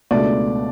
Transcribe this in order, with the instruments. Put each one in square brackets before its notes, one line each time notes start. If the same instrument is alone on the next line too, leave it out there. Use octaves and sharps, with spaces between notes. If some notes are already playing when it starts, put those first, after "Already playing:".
[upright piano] C#2 B2 A3 D4 [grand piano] D5